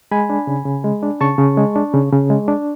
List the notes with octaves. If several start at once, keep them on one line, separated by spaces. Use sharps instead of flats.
G#3 G#5 B5
D4
C#3
C#3
G#3
D4
C#3 A5 C#6
C#3
G#3
D4
C#3
C#3
G#3
D4